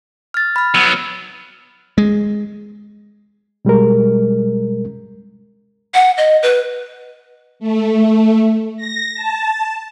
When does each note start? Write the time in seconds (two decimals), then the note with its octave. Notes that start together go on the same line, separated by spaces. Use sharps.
0.34 F6 A6
0.56 B5 F6
0.74 F#3 B3 E6
1.98 G#3
3.65 B2 G3 G#3 A#4
5.94 F#5
6.18 D#5
6.43 B4
7.60 A3
8.77 A#6
9.15 A5